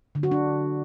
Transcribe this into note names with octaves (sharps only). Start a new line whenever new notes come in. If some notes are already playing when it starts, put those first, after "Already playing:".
D3
F#4
D4